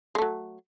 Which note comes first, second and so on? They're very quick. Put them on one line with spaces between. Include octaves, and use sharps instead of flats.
G#3 A3 F#3